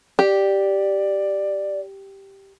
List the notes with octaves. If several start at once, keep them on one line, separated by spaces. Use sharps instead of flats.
G4 D5